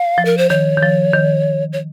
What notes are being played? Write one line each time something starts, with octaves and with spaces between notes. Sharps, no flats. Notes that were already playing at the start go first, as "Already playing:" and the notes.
Already playing: F5
F3
A#4
C5
D#3 C#5
D#3
F3
D#3
C#5